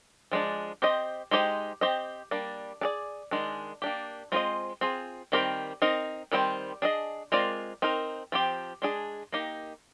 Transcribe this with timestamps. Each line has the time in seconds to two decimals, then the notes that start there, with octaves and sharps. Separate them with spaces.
0.32 F3 G#3 D4
0.82 C4 G4 C5 D#5
1.31 G#3 D#4 G4 C5 D#5
1.81 C4 G4 C5 D#5
2.31 G3 A#3 D4
2.81 D4 G#4 D5
3.31 D#3 G#3 D4
3.82 A#3 D4 G4
4.32 G#3 C4 F4 C5 D#5
4.81 C4 F4 G#4
5.32 D#3 G3 C4 G4 A#4
5.82 C4 D#4 A#4 D#5
6.32 D#3 G3 C4 F4 C5
6.82 D4 G#4 D#5
7.32 G#3 C4 F4 A#4 D5
7.82 C4 D#4 A#4
8.32 F3 C4 G4
8.82 G#3 D4 G#4
9.32 A#3 D#4 G4